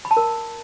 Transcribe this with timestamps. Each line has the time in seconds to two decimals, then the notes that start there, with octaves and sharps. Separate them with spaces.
0.05 B5
0.11 A5
0.17 A#4